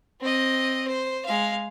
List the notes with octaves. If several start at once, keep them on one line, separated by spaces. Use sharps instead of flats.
C4 D#5
C5
G#3 F5